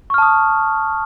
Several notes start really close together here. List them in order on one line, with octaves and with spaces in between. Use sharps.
C#6 F6 A5 D#6